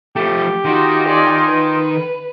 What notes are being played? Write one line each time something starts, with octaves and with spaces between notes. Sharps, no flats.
F3 A3 G4
D#3 D#4 F4 F#4 C6
D5 G#5
B4